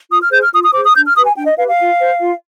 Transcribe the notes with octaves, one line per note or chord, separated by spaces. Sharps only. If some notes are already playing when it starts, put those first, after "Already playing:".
F4 D#6
F6
G#4 C5 G6
F6
F4 D#6
D#6
G#4 C5 D6
D#6
D4 G6
F6
G4 B4 D#6
G#5
D4 G5
D#5
G4 B4 F5
F5
F4
C5
F4